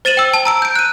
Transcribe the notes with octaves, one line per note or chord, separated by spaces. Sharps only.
C5 A6 D#7 E7 F#7
G5 E6
A5
A#5 E6 D7
G6 D7
F#6 D#7